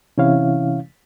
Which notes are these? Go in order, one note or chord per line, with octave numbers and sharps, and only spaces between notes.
C3 E3 C#4 E4 C#5 F5